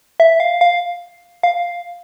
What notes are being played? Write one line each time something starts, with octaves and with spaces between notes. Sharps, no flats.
E5
F5
F5
F5